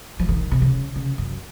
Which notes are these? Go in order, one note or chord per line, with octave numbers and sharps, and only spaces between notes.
F3
D#3
C3
C#3
C#3
F#2